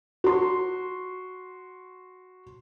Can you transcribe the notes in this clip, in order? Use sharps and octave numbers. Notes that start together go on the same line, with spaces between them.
F#4 C6